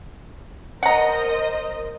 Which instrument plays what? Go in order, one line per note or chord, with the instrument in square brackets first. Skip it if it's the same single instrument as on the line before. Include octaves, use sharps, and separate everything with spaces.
[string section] A#4 C5 D#5 [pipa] F#5 A#5